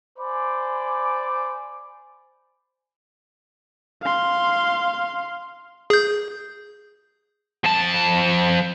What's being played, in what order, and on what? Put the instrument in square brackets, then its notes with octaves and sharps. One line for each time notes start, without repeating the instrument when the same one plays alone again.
[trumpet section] C5 D5 G#5 B5 D6
[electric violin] F5 C6
[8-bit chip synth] G#4 G6
[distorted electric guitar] F2 A5